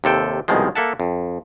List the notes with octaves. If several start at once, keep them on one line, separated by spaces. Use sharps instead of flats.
D#2 C3 A4 G5
C2 B2 D#3 F3 G#3
A#3 A4 E5 F#5 A5
F2